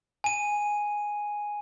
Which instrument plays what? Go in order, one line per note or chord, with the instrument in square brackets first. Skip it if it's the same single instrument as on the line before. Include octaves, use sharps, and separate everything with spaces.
[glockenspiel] G#5 D#7